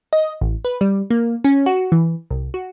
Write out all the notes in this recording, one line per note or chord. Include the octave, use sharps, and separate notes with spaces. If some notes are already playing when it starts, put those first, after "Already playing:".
D#5
A1
B4
G3
A#3
C#4
F#4
E3
C2
F#4